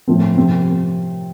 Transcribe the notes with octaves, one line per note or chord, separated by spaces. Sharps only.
A2 F3 C4
C3 F3 C4